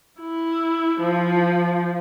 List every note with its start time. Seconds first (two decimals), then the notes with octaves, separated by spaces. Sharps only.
0.20 E4
1.01 F3